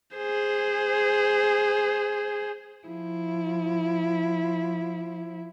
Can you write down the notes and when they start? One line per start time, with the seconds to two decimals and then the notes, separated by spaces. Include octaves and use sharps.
0.17 G#4 C5
2.87 F3 E4